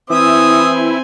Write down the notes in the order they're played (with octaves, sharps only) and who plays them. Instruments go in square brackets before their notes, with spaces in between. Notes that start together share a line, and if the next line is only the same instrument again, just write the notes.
[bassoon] E3 [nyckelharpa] C4 G#5 [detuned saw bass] E4 [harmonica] E5 D#6 E6